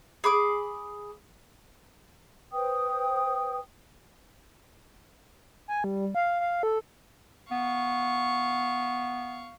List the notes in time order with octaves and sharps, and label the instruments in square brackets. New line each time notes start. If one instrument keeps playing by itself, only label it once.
[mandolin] G#4 B5 D6
[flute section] B4 C5 G5 D#6
[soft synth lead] G#5
G3
F5
F5
A4
[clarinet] B3 [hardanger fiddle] F5 C#6